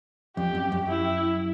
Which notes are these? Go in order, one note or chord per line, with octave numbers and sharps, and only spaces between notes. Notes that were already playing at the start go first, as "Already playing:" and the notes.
F2 G4
F#2
F#2
E4